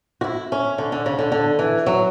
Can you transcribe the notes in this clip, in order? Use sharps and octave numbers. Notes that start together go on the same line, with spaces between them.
F#4
E4
C#4
D3
D3
C#3
D3
D3
E3
F#3